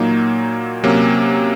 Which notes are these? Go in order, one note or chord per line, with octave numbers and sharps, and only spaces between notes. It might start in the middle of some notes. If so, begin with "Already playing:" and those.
Already playing: A#2 F#3 A#3 D#4
C3 F#3 A#3 C#4